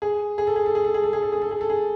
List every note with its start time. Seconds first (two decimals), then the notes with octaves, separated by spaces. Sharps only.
0.02 G#4
0.38 G#4
0.47 A4
0.56 G#4
0.66 A4
0.75 G#4
0.85 A4
0.94 G#4
1.04 A4
1.13 G#4
1.23 A4
1.32 G#4
1.42 A4
1.51 G#4
1.61 A4
1.70 G#4